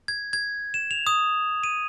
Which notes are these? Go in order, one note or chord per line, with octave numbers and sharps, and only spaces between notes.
G#6
G#6
E7
F7
D#6
D#7